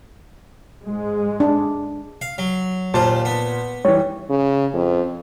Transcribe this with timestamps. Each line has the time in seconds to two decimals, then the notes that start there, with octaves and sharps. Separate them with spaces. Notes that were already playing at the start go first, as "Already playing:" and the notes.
0.85 G#2 G#3
1.40 D4
2.22 F5
2.38 F#3
2.94 D#2 A#2 F4 C5 A5
3.25 B3
3.85 E3 G3 C#5
4.30 C#3
4.74 F2